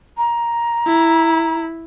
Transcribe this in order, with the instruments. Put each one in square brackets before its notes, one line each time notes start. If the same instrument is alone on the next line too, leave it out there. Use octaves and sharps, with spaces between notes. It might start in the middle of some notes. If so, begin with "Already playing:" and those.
[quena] A#5
[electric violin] E4